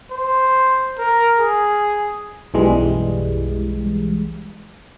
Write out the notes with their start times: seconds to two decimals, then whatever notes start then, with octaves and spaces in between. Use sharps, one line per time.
0.11 C5
0.99 A#4
1.38 G#4
2.54 B1 F#2 E3 G3 G#3